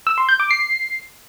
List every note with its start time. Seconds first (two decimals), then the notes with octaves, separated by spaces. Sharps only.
0.07 E6
0.18 C6
0.29 G6
0.40 D6
0.51 C7